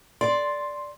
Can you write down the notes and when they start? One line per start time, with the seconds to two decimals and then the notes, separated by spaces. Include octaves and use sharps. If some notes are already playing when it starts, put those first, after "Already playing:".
0.21 D5 C6